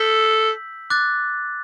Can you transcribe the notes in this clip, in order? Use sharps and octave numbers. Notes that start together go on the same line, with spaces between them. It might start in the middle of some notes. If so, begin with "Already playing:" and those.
Already playing: A4 E6 G6 B6 F#7
D6 F#6 A6